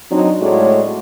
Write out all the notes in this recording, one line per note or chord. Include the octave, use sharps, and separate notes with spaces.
F#3 C4 D4 D#4
A2 G#3 A3 F#4 C#5 D5